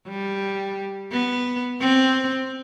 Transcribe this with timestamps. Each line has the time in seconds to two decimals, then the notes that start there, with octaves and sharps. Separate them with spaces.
0.08 G3
1.12 B3
1.80 C4